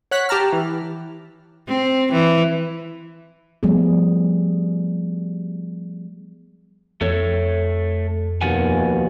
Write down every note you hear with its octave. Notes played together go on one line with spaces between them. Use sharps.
C#5 F#5 F#6 B6
G4 A5 A#5 F6
E3
C4
E3
F3 G3 A3 B3 G#4
F2 A3 A4 C#5
D#2 B2 F3 F#5 G#5